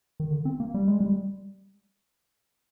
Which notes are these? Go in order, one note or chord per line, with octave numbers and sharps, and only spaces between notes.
D#3
D3
C4
A#3
G3
G#3
G3